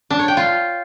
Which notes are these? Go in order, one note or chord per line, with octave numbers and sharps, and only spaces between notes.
D4
C#5
G5
F4